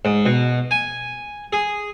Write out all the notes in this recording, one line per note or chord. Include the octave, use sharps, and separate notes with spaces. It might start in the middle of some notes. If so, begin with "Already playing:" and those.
G#2
B2
G#5
G#4